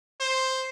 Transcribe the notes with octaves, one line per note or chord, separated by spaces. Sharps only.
C5